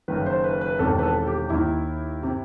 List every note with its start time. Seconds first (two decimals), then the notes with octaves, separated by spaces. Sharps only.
0.08 F#1 F#2 D#3 B4
0.26 C5
0.44 B4
0.61 B4
0.79 E1 E2 C3 D#3 A4
0.99 B4
1.03 A4
1.27 G4
1.50 D#2 D#3 E4
2.23 C3